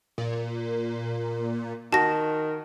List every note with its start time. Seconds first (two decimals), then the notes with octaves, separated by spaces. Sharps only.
0.18 A#2
1.92 D#3 F#4 A5 A#6